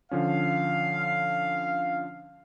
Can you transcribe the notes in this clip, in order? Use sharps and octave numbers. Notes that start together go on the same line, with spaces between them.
D3 F3 C#4 F5